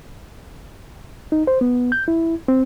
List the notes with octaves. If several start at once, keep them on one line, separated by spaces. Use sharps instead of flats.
D#4
C5
B3
G6
E4
C4